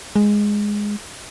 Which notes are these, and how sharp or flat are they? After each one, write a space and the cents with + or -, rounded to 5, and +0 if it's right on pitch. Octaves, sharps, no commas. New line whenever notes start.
G#3 -5